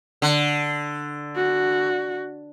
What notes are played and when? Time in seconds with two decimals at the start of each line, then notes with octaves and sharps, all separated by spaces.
0.22 D3
1.36 F#4